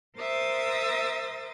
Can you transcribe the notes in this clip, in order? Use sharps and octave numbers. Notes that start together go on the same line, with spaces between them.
A#4 C5 E5 D#6 A6